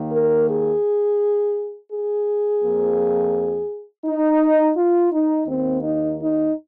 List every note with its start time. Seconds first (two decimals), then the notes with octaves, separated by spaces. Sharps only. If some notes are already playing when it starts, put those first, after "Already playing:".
Already playing: D#2 D#3 A#3
0.11 A#4
0.47 G#4
1.90 G#4
2.62 F2 F3 A#3
4.05 D#4
4.77 F4
5.12 D#4
5.48 D#2 D#3 A#3 C4
5.83 D#4
6.19 D#4